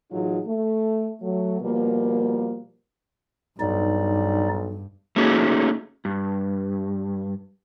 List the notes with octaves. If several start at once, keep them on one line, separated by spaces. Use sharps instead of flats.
A2 E3 F#3 D#4 F4 G#4
A3
F#3 A3
B2 F3 G3 A#3
B1 G2 D#4 D5
A3 A#3 C#4 D#4 F#4 G#4
G2